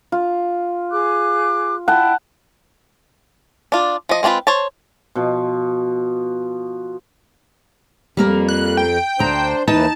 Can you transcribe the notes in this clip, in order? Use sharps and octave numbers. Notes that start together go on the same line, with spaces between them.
F4
G#4 D6 F#6
E4 F#5 G5 A5
D4 F4
F3 D#5
G#3 C4 C#4 F4 B4
C5 C#5 A5
B2 F3
F2 G3 A#3 A#4
F#6
G5
D2 D4 C5 A#5
D#2 E3 D#4 B4 A5